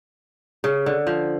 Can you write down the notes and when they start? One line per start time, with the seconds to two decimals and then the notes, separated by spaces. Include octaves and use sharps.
0.64 C#3
0.86 D3
1.07 F3